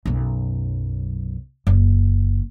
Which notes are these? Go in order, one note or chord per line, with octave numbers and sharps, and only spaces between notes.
B1 F#2
F#1